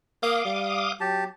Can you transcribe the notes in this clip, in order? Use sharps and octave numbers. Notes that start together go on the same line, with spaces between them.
A#3 F5 D6 D#6
G3
F#3 G4 A5